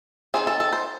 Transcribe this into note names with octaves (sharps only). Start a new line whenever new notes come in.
D#3 A3 C4 G#4
A4
A4
C5